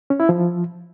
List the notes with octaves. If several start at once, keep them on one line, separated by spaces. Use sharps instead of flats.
C#4
E4
F3